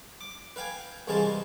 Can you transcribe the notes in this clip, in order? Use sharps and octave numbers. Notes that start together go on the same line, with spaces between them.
D6
B4 F5 G5 G#5
C2 E3 G#3 G#4 F5 A5